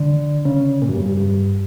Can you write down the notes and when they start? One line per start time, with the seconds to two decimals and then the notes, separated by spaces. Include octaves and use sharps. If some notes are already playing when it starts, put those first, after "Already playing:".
Already playing: D3
0.45 C#3
0.82 A#2
0.89 F#2
0.93 G2
1.06 G2
1.17 G2